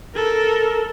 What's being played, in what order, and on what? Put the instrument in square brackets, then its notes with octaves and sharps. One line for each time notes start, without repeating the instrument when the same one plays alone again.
[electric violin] A4 A#4